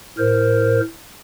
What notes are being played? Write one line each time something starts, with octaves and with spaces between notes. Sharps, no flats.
A2 A#4 C5